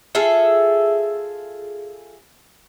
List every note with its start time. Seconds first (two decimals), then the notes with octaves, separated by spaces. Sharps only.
0.15 F4 G#4 A4 E5